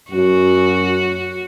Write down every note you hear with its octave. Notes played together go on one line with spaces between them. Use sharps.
F#2 F#4